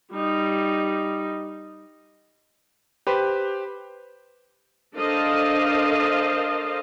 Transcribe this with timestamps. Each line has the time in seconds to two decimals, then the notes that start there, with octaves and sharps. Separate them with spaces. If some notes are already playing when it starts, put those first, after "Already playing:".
0.11 G3 D#4
3.07 G4 B4 C5
4.96 D4 A4 A#4 C5 D#5 F5